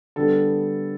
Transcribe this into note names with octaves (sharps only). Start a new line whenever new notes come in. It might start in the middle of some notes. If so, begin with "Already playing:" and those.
D3 G3 B3 A4